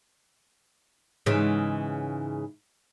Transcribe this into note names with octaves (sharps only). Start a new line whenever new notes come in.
G#2 C#3 E3